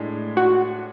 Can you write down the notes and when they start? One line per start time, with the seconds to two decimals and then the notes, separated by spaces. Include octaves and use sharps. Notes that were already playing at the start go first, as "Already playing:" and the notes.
Already playing: A2 G#3 D4
0.37 F#4